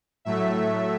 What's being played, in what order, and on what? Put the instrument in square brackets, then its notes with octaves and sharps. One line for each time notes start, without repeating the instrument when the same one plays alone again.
[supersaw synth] A2 F#3 A3 E5